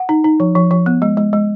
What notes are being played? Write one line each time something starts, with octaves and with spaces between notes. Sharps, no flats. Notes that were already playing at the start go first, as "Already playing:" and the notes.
Already playing: F#5
D#4
D#4
F3
F3
F3
B3
G#3
G#3
G#3